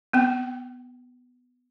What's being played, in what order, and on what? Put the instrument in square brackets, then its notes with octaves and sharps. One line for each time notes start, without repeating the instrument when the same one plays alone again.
[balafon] B3 C4 G5